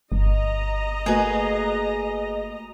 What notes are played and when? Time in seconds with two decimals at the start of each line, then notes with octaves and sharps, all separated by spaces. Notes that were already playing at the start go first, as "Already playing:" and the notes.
0.12 G1 D#5 A#5
1.06 A3 A#3 F#4 G#4 B4